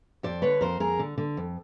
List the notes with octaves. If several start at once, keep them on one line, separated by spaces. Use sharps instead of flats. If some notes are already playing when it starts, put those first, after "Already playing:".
F2 C5 D5
D3 B4 C#5
F2 A#4 C5
F2 G#4 A#4
D3
D3
F2